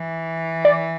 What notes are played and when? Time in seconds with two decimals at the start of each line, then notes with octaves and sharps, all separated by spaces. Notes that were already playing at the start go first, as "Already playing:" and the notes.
Already playing: E3
0.65 D5